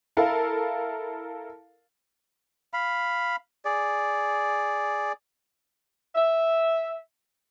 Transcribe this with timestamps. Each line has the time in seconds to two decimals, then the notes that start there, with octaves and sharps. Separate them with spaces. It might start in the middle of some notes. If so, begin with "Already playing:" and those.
0.17 E4 A4 A#4 F5
2.73 F5 B5
3.65 G#4 D5
6.15 E5